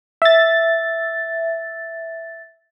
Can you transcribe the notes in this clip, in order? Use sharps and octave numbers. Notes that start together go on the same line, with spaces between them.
E5 A6